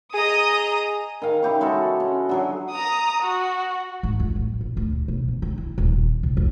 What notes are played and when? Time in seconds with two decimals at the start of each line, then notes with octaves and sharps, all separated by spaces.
0.14 G#4 D#5 A#5 D#6
1.22 D#3 F5
1.43 C#3 E4 G4 C#5
1.61 G#3 F#4 A4 A5
2.00 C#4
2.29 D3 F#3 G#4
2.71 A#5 D#6
3.22 F#4
4.03 G#1
4.20 F2
4.36 A1
4.61 A#1
4.77 D2
5.08 B2
5.28 D3
5.42 D3
5.58 E4
5.78 D#1
6.23 C2
6.37 F2